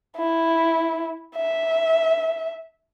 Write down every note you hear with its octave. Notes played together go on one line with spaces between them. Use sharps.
E4
E5